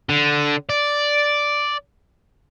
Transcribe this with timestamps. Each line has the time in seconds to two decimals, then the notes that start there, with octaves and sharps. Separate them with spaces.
0.09 D3
0.69 D5